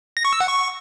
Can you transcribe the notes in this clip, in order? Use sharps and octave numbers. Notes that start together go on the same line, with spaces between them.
A#6
C#6
E6
F#5
C#6